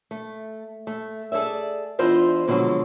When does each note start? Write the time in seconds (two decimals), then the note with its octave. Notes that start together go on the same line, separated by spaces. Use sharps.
0.11 A3
0.87 A3
1.32 G#4 A4 C#5 D5 E5
1.99 E2 D4 E4 F4 C5 D#5
2.48 B2 D3 F3 F#3 G#3 A4